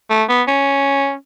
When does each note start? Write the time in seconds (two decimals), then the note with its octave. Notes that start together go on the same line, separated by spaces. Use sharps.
0.10 A3
0.29 B3
0.48 C#4